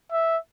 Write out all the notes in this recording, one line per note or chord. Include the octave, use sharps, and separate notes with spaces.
E5